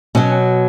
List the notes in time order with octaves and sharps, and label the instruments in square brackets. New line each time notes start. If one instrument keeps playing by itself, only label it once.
[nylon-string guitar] B2 F#3 C#4